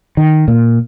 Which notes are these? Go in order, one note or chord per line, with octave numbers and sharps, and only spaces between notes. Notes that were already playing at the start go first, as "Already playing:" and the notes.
D#3
A#2